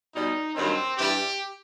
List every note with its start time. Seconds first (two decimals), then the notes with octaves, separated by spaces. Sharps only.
0.14 B2 G3 D#4
0.55 G2 D#3 F#3 C4
0.97 G2 E3 G3 G4